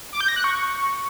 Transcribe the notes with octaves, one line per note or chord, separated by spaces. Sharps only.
D6
G6
A#6
F#6
C#6